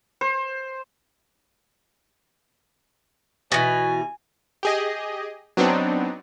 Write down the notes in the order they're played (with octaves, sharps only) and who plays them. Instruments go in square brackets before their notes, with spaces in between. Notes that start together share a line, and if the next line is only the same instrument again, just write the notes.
[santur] C5
[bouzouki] B2 E3 [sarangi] G#5
[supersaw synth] G4 G#4 D#5
F#3 B3 C4 D4 D#4